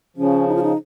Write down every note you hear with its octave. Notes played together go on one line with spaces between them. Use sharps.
C#3 F3 C#4
D#4
F4
D#4